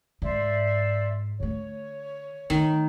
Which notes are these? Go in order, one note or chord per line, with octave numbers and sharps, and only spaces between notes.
G#2 C5 D5 E5
D3 A3 C#5
D#3 A3